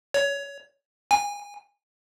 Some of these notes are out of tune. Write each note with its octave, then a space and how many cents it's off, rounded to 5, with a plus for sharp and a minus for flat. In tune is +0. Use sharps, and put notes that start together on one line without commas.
C#5 +20
G#5 -25